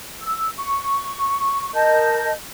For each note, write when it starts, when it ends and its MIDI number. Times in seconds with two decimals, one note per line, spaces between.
0.21 0.50 88
0.57 1.74 85
1.74 2.32 70
1.74 2.32 75
1.74 2.32 81
1.74 2.32 91